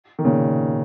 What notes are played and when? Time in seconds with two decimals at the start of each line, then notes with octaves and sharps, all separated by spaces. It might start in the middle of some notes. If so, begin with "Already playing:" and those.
0.19 D#3
0.25 A#2 C#3